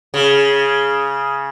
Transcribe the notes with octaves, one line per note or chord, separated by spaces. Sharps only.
C#3